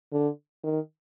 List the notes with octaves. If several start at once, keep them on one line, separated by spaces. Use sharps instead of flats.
D3
D#3